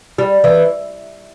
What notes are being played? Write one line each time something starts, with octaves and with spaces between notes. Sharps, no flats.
G3
E3